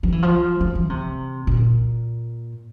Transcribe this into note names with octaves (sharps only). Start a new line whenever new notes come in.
F3
E3
F3
F3
E3
C3
A#2